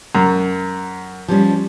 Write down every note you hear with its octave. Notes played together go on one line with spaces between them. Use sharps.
F#2
F3 G3 C#4